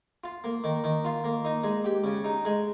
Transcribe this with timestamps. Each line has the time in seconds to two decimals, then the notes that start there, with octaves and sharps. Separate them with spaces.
0.24 F4
0.44 A#3
0.64 D#3
0.84 D#3
1.05 F4
1.24 A#3
1.45 D#4
1.64 G#3
1.84 G4
2.04 C#3
2.24 D#4
2.45 G#3